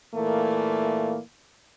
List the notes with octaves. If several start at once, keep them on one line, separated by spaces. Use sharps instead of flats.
A#2 E3 A3 A#3